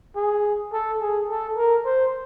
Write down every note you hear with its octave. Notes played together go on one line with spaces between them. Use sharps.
G#4
A4
G#4
A4
A#4
C5